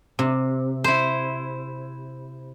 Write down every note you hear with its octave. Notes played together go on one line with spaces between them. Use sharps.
C3
E4 C5